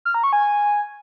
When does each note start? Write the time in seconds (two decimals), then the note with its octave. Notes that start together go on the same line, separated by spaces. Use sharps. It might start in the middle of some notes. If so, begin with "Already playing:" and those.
0.05 F6
0.14 A#5
0.24 C#6
0.33 G#5